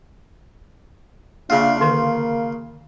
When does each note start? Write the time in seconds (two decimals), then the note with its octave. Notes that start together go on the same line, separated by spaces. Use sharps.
1.50 C#3 A#3 D4 F4 G#4 E5
1.80 D3 D#3 A#3 C6